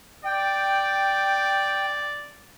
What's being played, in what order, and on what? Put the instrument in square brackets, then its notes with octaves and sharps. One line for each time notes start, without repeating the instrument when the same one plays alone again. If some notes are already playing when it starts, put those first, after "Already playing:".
[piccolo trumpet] D5 [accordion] G5